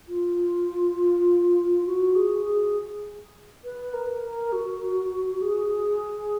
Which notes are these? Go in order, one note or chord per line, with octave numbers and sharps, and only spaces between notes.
F4
F#4
G#4
G#4
B4
A#4
A#4
F#4
G#4